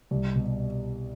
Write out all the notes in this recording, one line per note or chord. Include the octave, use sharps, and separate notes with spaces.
C2
B2